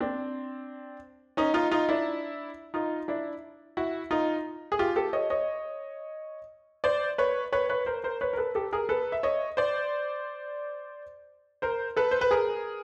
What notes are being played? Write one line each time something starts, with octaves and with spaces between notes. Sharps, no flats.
C4 D4
C#4 D#4
D#4 F4
D#4 F4
D4 E4
D#4 F4
D4 E4
E4 F#4
D#4 F4
G#4
F4 G4
G4 A4
C#5 D#5
C#5 D#5
C5 D5
B4 C#5
B4 C#5
B4 C#5
A#4 C5
A#4 C5
B4 C#5
A#4
A4 B4
G4 A4
G#4 A#4
A4 B4
E5
C#5 D#5
C5 D5
A#4 C5
A4 B4
C5
B4
G#4 A#4